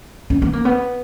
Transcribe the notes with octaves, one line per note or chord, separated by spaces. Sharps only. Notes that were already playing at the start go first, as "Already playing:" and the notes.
C#4
B3
A#3
B3